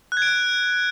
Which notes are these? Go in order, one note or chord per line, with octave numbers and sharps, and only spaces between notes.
F#6
G#6
D7
F#6